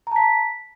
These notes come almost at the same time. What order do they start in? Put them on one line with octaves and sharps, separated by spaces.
A#5 A5 B6